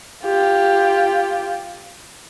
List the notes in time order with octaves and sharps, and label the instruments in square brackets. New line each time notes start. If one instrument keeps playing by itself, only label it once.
[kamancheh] F4 G4